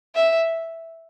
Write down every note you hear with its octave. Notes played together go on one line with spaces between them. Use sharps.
E5